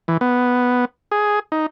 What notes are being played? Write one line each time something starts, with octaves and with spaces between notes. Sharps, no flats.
E3
B3
G#4
D#4